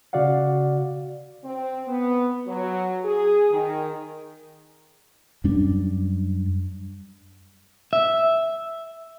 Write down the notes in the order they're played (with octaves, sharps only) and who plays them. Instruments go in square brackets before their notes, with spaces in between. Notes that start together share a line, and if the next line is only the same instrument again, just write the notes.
[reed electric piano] C#3 F#4 D5 F5 F#5
[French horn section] C4
B3
F#3
G#4
D#3
[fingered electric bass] F#2 G3 C#4 D4
[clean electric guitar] E5